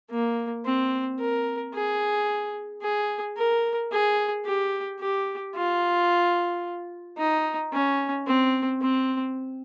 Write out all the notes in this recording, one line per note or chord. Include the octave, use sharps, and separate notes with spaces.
A#3
C4
A#4
G#4
G#4
A#4
G#4
G4
G4
F4
D#4
C#4
C4
C4